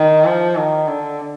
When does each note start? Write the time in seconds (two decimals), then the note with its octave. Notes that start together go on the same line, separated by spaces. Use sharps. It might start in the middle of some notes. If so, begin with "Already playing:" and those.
Already playing: D#3
0.25 F3
0.56 D#3
0.87 D3